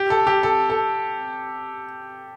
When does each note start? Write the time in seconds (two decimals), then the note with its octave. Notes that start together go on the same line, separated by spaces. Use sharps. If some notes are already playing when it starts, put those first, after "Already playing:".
Already playing: G4
0.10 A4
0.27 G4
0.43 A4
0.70 A4